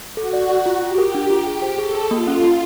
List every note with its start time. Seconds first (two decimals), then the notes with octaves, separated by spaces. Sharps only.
0.17 F#4 A4
0.33 D5
0.49 D5
0.66 F4
0.82 F4 G4
0.98 A#4
1.14 D4
1.30 F4
1.47 G4 G#4
1.62 C5
1.78 G#4 A4
1.95 G#4
2.11 A#3 F4
2.27 C#4
2.43 A#3